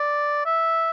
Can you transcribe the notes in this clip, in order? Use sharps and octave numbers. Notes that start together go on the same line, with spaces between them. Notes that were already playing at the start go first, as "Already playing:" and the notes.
Already playing: D5
E5